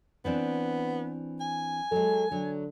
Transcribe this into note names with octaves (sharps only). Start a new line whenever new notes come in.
E3 B3 C4 D4
G#5
F#3 G#3 A4
D3 F#3